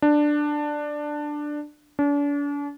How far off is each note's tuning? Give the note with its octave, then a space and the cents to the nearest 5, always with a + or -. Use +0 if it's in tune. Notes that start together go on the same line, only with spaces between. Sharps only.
D4 +10
D4 -40